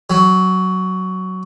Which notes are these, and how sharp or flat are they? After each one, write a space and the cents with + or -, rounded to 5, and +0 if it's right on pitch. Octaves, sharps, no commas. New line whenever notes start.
F#3 +10